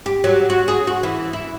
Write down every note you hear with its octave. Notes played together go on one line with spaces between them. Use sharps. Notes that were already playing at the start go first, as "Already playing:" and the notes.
G4
F#3
F#4
G#4
F#4
E3
E4